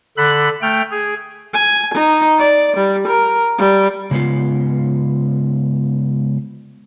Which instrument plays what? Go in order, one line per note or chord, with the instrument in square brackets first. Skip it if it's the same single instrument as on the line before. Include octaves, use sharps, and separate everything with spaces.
[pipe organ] D3 A4 B5 F#6
A3 G5 F6
G#4
[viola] G#5
D#4
D5
G3
A#4
G3
[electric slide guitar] C#3 G#3 B3 F4